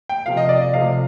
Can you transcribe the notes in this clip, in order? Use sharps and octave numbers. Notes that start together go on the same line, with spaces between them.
G5
C3 F3 A3 F5
D#5
D5
D#5
C3 F3 A3 F5